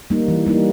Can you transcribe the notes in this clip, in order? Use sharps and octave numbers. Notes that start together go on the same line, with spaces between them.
G3 A#3 D#4
E3
G3 A#3 D#4